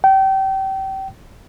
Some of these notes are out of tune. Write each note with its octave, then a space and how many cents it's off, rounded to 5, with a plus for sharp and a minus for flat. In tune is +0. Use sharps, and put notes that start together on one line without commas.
G5 -30